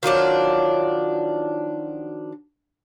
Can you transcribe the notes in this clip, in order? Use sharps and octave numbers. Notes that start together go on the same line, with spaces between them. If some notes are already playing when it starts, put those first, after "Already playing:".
D#3 F3 F#3 D4